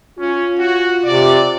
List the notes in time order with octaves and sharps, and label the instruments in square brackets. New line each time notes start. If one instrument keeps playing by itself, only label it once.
[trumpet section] C#4 [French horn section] F4
[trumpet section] F#4
[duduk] C3 [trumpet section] D5